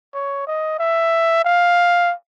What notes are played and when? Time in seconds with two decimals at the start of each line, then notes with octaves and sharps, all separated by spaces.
0.14 C#5
0.47 D#5
0.79 E5
1.44 F5